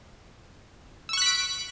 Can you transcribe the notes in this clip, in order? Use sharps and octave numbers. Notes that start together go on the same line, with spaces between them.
C#6 E6 F#6 B6 D7